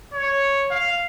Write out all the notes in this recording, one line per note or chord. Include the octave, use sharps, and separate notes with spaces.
C#5
F5